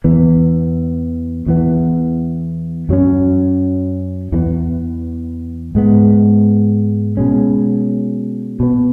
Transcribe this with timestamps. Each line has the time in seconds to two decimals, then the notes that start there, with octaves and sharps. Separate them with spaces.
0.04 E2 E3 B3
1.46 E2 E3 B3
2.89 F#2 F#3 C#4
4.32 E2 E3 G#3 B3
5.75 G#2 G#3 B3
7.17 B2 G#3 C#4
8.60 B2 B3